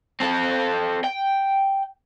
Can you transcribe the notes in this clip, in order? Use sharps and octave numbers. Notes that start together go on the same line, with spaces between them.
C4 A4
G5